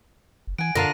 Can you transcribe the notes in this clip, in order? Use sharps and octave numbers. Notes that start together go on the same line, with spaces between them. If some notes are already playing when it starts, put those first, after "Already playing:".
F#1
E3 F#5 G#5 D7
F#2 D3 F4 A#4 F5 A5 A#6 D#7